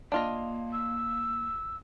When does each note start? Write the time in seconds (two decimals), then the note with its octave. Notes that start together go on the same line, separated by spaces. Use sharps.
0.12 A#3 D4 F4 D#5
0.73 E6